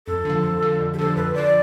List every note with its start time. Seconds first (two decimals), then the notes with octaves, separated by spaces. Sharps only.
0.07 F2 A4
0.25 D3 F3
0.43 F2
0.62 D3 F3
0.80 F2
0.94 G4
0.98 D3 F3 A4
1.16 F2 B4
1.34 D3 F3 D5